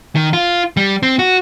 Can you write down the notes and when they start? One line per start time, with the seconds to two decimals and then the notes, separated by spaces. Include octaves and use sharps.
0.15 D#3
0.33 F4
0.77 G3
1.03 C4
1.19 F#4